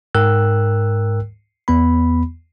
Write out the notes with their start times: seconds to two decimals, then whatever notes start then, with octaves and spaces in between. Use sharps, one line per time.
0.15 G#2 A#4 G5 E6 F#6
1.68 E2 B3 B5